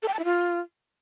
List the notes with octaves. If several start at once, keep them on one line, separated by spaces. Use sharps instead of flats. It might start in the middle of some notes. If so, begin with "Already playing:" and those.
A4
G5
A5
E4
F4